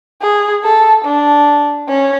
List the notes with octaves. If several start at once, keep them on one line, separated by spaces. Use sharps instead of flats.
G#4
A4
D4
C#4